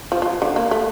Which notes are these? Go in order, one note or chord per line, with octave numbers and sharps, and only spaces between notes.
F3
F3
D3
A#3
A3